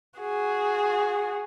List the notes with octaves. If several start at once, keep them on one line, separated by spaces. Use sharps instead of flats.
F#4 G#4